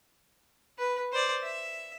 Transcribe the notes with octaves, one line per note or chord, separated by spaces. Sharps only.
B4
C5 D5
E5